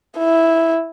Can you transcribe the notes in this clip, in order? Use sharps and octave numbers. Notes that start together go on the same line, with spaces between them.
E4